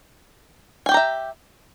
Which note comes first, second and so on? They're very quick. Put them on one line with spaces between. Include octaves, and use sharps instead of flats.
G#5 G5 G4 A#5 E5